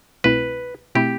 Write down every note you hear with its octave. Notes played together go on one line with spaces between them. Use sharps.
C2 B2 A3 C4 E4 B4
B2 A3 C4 E4 G4